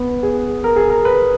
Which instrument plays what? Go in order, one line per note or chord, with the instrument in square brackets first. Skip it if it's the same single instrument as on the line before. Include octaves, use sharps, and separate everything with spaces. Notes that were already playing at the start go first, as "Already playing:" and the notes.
Already playing: [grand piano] B3
G#4
A#4
G#4
A#4
B4